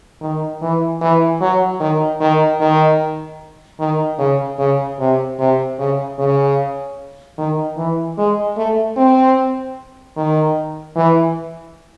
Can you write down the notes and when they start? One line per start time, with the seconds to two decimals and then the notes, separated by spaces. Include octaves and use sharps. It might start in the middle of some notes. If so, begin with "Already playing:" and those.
0.21 D#3
0.62 E3
1.01 E3
1.40 F#3
1.80 D#3
2.21 D#3
2.60 D#3
3.80 D#3
4.19 C#3
4.59 C#3
4.99 C3
5.39 C3
5.79 C#3
6.19 C#3
7.38 D#3
7.77 E3
8.18 G#3
8.57 A3
8.97 C4
10.17 D#3
10.96 E3